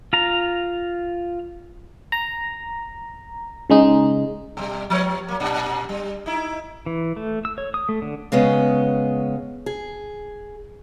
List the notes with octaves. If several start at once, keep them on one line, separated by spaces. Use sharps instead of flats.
F4 A#5
A#5
C#3 G#3 D#4
B2 G3
F3 B3 C#5
F#3 A#3
A#2 D4
G3
D#4 E4
E3
A3
E6
C#5
D#6
A3
D3
C#3 G#3 B3 C#4
G#4